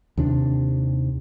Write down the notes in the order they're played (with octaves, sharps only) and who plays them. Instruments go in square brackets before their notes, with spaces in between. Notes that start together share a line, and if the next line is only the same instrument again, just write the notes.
[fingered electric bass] D#2 C3 D4